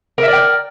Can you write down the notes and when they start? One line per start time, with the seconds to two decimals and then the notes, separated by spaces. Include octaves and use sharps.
0.18 A#4
0.23 E5
0.28 D5
0.33 G5